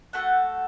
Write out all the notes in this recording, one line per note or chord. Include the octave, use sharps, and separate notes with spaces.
A3 F#4 A4 F#5